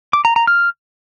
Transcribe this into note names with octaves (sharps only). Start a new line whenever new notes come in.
D6
A#5
A#5
F6